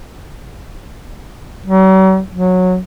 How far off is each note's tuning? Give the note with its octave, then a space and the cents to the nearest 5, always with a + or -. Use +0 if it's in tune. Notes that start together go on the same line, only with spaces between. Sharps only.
F#3 +45
F#3 -15